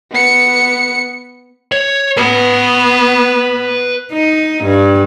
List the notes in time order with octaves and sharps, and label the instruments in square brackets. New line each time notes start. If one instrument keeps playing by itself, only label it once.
[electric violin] B3 C#7
[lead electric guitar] C#5
[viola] B3 [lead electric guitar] B4 A5
[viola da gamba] D#4
G2